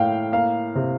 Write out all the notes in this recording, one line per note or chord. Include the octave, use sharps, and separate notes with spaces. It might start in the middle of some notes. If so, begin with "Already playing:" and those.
Already playing: A2 A#3 F5 G5
A#3 F5
C3